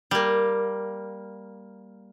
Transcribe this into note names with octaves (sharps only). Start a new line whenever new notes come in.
G3 A#3